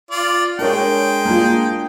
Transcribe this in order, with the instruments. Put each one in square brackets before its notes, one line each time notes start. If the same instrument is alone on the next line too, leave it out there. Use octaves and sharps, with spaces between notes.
[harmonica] F4 D5
[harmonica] G#3 G5 [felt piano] D4 A#4 C#5
[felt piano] A#3 D4 F4